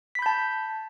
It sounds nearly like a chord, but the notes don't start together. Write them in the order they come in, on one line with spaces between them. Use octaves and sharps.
B6 B5 G6 A5